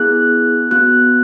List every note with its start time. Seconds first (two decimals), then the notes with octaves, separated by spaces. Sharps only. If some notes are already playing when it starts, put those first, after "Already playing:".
Already playing: B3 E4 G#4 F#6
0.71 B3 F#4 F#6